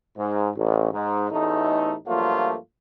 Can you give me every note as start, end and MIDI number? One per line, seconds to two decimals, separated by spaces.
0.17 0.49 44
0.57 0.90 33
0.92 1.30 44
1.30 1.94 33
1.30 1.94 40
1.30 1.94 57
1.30 1.94 63
2.07 2.55 43
2.07 2.55 53
2.07 2.55 54
2.07 2.55 57
2.07 2.55 58
2.07 2.55 65